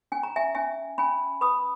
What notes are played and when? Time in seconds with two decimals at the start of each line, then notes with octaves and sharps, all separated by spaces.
0.12 C#4 G#5
0.23 A#5
0.36 E5 G#5
0.55 C#4 E5 G#5
0.98 C#4 G#5 B5
1.41 B4 B5 D#6